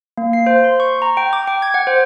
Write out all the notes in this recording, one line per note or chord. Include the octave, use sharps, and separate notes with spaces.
A#3
C7
C5
C6
C#6
A#5
G5
D6
G5
G#6
F#5
C5